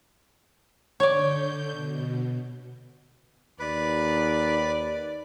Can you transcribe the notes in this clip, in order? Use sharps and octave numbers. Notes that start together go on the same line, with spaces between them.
D3 C#5 D5 G6
B2
D#2 B4 D5